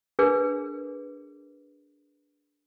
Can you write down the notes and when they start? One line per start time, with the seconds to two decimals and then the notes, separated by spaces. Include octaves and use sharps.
0.19 D4 G#4 A#4 B4